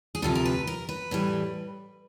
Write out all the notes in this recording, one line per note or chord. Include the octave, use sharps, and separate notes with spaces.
G#4
D2 C3 F3 A4
A#4
B4
A#4
B4
A2 E3 G3